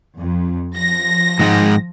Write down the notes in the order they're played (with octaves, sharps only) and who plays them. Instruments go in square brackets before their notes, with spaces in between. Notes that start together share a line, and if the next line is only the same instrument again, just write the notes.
[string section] F2
F3 A#6
[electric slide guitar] G#2 D#3 G#3